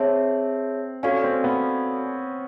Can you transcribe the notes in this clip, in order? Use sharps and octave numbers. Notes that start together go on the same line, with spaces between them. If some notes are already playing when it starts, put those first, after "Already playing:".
Already playing: C4 G#4 C#5 E5 A5
C#4 F#4 A4 D5 F5 G#5
C4
B3